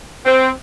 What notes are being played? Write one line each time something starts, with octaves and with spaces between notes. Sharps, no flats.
C4